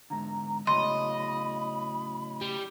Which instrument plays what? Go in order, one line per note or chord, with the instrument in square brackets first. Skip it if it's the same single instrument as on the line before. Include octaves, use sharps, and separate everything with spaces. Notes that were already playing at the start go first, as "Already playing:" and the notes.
[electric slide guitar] G#2 D3 [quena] A#5
[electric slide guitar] A2 C#3 F#3 [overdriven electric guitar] D#5 [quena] B5 [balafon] C6
[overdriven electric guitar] G3